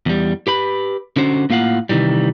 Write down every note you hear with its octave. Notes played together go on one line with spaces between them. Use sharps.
E2 G3
G4 B4 B5
D3 C#4 F#4 C5
A2 A#3 F4 F5 F#5
C3 D#3 E3 G3